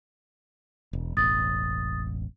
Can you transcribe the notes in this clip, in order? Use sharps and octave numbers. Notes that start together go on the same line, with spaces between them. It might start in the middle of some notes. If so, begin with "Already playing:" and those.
E1
E1 A1 D#6 A6